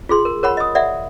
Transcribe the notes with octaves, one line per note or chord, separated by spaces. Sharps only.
F4 G#4 C6
A#4
A#4 C#5 F#5 B5
D#5 D#6
D5 E5 F#5